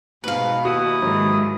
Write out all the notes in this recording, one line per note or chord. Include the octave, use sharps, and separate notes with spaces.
G#2 B2 B4 F5
D#2 E4 F#4 D#6
G#2 D#3 E3 F#3